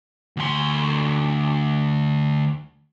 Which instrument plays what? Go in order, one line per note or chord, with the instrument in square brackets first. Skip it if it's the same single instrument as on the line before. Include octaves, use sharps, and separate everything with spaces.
[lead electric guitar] D2 C6